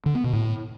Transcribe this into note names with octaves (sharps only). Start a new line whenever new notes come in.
D3
B3
B2
A2